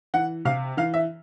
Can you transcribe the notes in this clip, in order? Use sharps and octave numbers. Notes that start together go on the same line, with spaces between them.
E3 F#5
C3 F5
E3 F5
E5